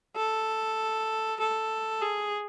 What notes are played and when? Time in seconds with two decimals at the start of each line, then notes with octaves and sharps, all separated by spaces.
0.16 A4
1.40 A4
2.02 G#4